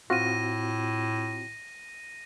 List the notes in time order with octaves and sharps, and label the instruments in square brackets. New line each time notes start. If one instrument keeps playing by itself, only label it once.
[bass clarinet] A2 [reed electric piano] C4 F4 F#4 [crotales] A#6 D#7